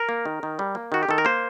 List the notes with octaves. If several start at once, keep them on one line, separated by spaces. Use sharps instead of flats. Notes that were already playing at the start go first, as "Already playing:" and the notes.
Already playing: A#4
A#3
D#3
D#3
G3
A#3
D#3 F#4
G4
D#3 A4
A#4
A#3 C5